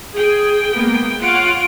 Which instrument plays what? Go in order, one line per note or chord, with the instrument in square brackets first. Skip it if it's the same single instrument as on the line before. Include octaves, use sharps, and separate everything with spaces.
[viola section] G#4 [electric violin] G5
[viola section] G#3 A#3 B3
[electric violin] F4 D7 [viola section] C#5 F5 F#5